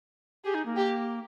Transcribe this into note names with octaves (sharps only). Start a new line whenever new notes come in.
G4 G#4
D#4
A#3
G4